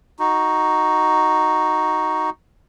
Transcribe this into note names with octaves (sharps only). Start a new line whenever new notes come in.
D#4 F#4